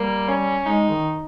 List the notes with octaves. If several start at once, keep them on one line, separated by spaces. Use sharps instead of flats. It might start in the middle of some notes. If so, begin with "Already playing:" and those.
Already playing: G3 A#3
C#4
G#3 D#4
D#3